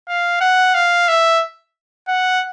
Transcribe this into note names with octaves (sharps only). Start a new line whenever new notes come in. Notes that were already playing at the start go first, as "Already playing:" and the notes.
F5
F#5
F5
E5
F#5